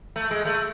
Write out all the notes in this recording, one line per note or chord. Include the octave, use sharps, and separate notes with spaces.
A3
G#3
A3